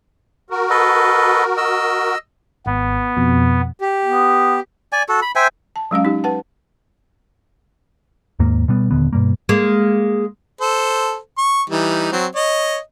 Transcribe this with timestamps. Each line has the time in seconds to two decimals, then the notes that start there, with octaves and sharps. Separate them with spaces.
0.50 F#4 A#4
0.70 A4 B4 D#5
1.57 D#5 E6
2.66 G#1 B3
3.17 F2 B2
3.81 G4
4.05 B3
4.93 D5 G#5
5.09 F#4 A4
5.22 B5
5.36 C5 E5 G5 G#5
5.76 A5
5.91 F#3 G#3 C#4 F5
6.05 D#4 G4
6.24 B4 F#5 A5
8.39 D#2 G#2 A#3
8.68 B2 G3 B3
8.91 D#1 D3 B3
9.13 G2 B2 G3 A#3
9.49 G#3 A#3
10.61 A4 C5
11.38 C#6
11.70 E3 G3 D#4
12.12 F#3 C4
12.35 C#5 D#5